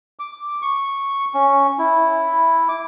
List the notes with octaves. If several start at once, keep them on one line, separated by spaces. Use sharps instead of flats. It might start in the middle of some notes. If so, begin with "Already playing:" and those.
D6
C#6
C#4
E4
D6